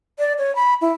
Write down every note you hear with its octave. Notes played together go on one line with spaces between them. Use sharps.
D5
C#5
B5
E4